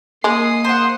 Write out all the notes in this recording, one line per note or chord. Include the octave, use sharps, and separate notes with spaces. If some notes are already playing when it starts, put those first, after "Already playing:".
G#3 A#3 D#6 C7
C5 F#5